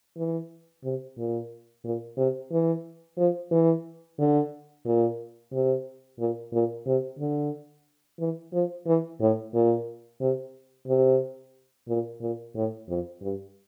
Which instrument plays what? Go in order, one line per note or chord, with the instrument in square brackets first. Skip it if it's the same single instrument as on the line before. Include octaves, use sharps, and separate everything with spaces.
[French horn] E3
C3
A#2
A#2
C3
E3
F3
E3
D3
A#2
C3
A#2
A#2
C3
D3
E3
F3
E3
A2
A#2
C3
C3
A#2
A#2
A2
F2
G2